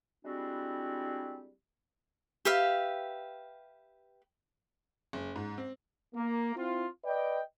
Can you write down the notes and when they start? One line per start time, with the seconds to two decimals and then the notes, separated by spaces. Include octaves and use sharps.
0.25 G3 G#3 C4 D4 E4 F#4
2.45 G4 B4 E5 F5
5.13 F#1
5.36 G#2
5.58 C4
6.15 A#3
6.56 C4 E4 F4
7.04 B4 D5 D#5 G5